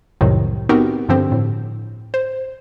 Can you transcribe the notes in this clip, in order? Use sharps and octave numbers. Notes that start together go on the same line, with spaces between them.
C2 F2 A2 C3 D#3 F#3
B3 C4 D#4 F#4 G4 A#4
G2 D3 F3 C4 G4
A2
C5